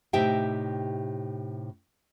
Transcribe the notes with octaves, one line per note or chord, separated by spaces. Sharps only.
A2 C3 D#4 G4 E5 G5